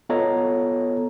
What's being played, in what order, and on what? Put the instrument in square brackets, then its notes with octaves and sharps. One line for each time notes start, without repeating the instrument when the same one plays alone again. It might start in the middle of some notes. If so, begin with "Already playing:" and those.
[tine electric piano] B3 F4 A4 C#5 D#5 A#5